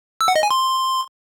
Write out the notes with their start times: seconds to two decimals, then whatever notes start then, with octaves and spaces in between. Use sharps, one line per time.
0.21 E6
0.28 F#5
0.36 D#5
0.43 G#5
0.51 C6